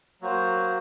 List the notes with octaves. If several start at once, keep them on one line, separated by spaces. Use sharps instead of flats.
F#3 A#3 F#4 C5